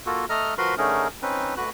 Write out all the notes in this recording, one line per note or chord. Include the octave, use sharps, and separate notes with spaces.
A#3 F4 F#4 A4
A3 A4 D#5 A#5 F6
F3 F#4 A#4 B4 B5 C6
D3 A3 C#4 D#4 G#4 A#4
C4 C#4 D#4 B4
D2 D3 F#4 B4 F#6